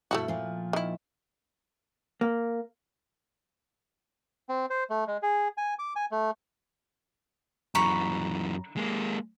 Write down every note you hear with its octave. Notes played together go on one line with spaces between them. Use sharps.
G2 B2 A3 E4 F#4 A4
A#2 F3
D#3 E4
A#3
C4
C5
A3
G#3
G#4
G#5
D6
G#5
A3
F#2 E3 A#5 B5 C#6
G#3 A#3